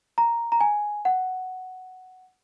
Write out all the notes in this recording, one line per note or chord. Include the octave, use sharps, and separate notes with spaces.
A#5
A#5
G#5
F#5